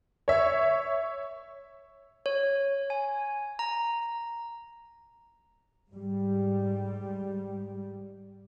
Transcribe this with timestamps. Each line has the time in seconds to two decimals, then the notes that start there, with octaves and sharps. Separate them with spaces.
0.28 C#5 E5
2.26 C#5
2.90 G#5
3.59 A#5
5.91 G#2 G3